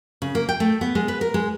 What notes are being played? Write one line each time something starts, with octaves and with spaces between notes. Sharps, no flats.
C#3
A#3
G5
A3
B3
G#3
B4
A#4
G#3